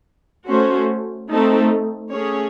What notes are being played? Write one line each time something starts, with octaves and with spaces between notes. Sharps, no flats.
A3 C#4 F#4 C5
A3 C4 D#4 A4
A3 C#4 G#4 C#5